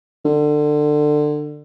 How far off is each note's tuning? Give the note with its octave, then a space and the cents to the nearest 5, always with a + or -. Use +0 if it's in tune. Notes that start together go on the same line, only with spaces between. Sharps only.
D3 +25